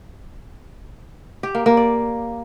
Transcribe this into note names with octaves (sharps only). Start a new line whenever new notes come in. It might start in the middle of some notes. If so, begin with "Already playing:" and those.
G4
A#3
A#3
D5